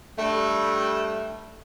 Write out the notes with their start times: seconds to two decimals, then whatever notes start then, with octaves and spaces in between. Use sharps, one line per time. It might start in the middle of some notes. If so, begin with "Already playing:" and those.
0.19 G2 G3 A3